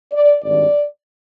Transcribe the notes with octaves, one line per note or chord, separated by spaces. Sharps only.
D5
G#1 G2 D#3 D5